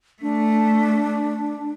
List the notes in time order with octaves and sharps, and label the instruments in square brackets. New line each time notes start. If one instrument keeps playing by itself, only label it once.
[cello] A3 [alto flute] D4